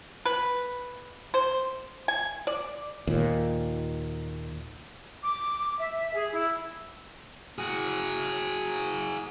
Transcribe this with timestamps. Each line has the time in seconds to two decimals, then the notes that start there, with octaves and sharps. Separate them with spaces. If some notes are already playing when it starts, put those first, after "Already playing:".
0.26 B4
1.34 C5
2.08 G#5
2.47 D5
3.07 D#2 A#2
5.22 D6
5.78 E5
6.15 G#4
6.32 E4
7.58 F#4 G#4